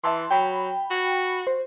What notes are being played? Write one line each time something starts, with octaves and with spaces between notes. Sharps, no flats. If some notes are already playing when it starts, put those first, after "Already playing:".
E3 E5 A5 C6
F#3 G5 B5
F#4
C5